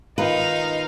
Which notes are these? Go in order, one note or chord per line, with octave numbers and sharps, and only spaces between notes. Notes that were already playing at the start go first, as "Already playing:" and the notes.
D#3 D#4 F4 B4 F5